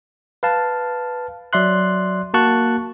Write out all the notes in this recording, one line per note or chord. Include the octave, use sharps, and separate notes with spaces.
B4 F5 A5
F#3 D5 E5 C6 F#6
A#3 F#4 A5 C#6 F#6